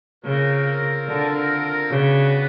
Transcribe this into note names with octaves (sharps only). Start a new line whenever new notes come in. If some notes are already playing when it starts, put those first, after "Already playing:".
C#3 C4 F4 A#4
D3
C#3 B3 D4 F#4 B4